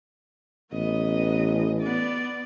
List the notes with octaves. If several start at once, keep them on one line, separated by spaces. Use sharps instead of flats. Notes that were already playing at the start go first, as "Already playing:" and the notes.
A1 B3 D#5
B3 D5